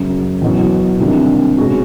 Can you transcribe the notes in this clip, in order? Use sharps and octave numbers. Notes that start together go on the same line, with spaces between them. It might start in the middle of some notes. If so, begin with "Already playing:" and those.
Already playing: F#2 C#3 F#3
E2 B2 F#3
C3 D#3 G3 A#3 D4
B2 G#3 C#4 F#4